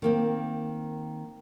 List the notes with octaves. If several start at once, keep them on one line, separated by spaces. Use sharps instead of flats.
D#3 A#3 C4